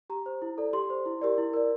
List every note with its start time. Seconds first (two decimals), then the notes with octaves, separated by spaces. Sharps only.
0.10 G4 A#5
0.26 C5
0.42 E4
0.58 A4 D5
0.73 G4 C6
0.90 C5
1.06 E4
1.21 G4 A#4 D5
1.38 E4
1.53 A#4 D5